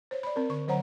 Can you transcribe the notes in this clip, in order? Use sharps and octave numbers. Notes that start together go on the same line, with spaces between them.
C5 C#5
D5 B5
C4 A#4
D3 C#6
D3 F#3 C5 C#5 F#5 A#5